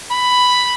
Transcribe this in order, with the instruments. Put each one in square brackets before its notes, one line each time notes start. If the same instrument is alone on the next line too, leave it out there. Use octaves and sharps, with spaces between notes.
[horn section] B5